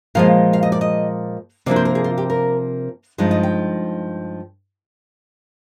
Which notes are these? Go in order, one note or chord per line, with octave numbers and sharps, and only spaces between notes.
A#2 F3 G#3 F5
F5
D#5
D5
D#5
C3 F3 A#3 D4 D5
C5
A#4
G#4
F4
G4
A#4
G2 F3 G#3 D#4
D#5
G5